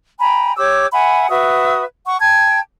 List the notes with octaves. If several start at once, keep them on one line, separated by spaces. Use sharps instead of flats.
G5 G#5 A#5 B5
G4 C#5 D6 E6
E5 F#5 G#5 B5
F#4 B4 E5 D#6
F#5 C#6
G5 A5 G#6